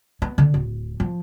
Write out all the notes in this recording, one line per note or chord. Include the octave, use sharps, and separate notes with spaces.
B3
D3
D1
F3